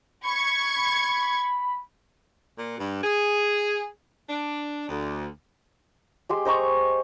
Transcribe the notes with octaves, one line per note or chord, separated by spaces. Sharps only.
B5 C#6 G#6
A#2
G2
G#4
D4
D2
G#3 G4 C6
C5 D#5 A#5 C#6